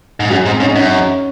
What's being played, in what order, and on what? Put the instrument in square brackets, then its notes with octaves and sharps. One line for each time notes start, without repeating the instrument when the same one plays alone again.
[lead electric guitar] G#2
[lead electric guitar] F#2 [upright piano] G#4
[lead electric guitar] G#2 [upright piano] C4 C5
[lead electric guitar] G#2 [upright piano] C#4 C#5
[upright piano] D#4 D#5
[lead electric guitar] F#2 [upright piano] C#4 C#5